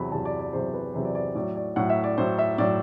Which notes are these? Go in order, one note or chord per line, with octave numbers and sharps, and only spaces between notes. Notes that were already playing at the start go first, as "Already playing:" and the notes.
Already playing: E2 C3 F#3 B5
E2 C3 F#3 A5
D5
D5
E2 C3 F#3 C5
B4
E2 C3 F#3 C5
D5
D5
A2 F#3 D5
D5
A2 F#3 F#5
E5
D5
A2 F#3 C5
E5
A2 F#3 D5